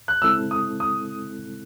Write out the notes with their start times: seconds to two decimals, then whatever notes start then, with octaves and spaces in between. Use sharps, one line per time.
0.08 F#6
0.22 C#3 G#3 C4 E4 A4 E6
0.51 D#6
0.80 D#6